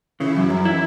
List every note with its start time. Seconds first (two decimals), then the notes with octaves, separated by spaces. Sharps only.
0.20 C#3 E3 E4
0.36 F#2
0.50 F#2
0.65 E4